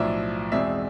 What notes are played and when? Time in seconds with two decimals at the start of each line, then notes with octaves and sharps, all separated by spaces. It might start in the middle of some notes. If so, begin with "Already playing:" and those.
Already playing: B1 A2 F3 D5 E5
0.52 E2 B2 G#3 C4 D5 E5